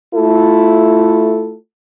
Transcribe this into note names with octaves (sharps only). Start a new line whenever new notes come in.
A3 E4 F4 A4